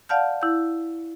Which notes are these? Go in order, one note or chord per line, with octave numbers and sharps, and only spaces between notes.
D5 F5 F#5 A5 F6 G6
E4 G6